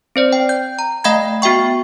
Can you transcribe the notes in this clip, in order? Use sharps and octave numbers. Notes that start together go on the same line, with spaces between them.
C4 C5 D5
G5
G6
A#5
A3 D#5 F5 G5 B5 G#6
B3 F#4 E5 G5 C#6